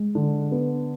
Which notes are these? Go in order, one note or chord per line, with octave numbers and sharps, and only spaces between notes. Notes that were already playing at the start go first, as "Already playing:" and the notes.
Already playing: G#3
D3
B3